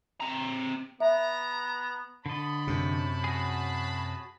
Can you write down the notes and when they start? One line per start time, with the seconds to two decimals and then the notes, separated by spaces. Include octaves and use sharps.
0.20 C4 A#5
1.00 B3 E5 A#5
2.26 D3 C#5 D#5 A5 B5
2.67 F#2 C3
3.24 F#4 G#4